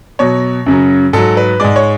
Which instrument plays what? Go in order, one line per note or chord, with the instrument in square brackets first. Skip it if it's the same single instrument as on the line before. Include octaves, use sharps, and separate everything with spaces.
[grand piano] B2 F#3 C#5
F#2 C#3 F#3
G#2 F#3 A4
B4
G#2 G#3 D5
C#5